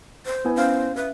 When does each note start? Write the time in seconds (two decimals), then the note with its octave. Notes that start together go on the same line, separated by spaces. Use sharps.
0.26 C5
0.45 B3 E4 G#5
0.56 C#4 C5 F5 F6
0.96 B4 E5